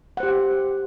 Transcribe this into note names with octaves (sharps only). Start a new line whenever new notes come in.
G4 C5 F#5